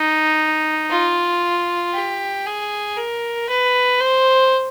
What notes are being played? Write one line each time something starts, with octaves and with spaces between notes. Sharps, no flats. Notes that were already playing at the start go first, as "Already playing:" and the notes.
Already playing: D#4
F4
G4
G#4
A#4
B4
C5